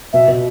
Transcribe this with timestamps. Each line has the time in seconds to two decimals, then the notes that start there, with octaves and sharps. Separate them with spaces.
0.13 B2 E5
0.28 B2